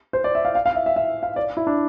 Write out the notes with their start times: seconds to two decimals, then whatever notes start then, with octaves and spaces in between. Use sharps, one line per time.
0.13 C5
0.24 D5
0.35 E5
0.45 F5
0.55 F5
0.66 F5
0.75 E5
0.86 E5
0.96 E5
1.23 F5
1.36 D5
1.57 E4
1.67 D4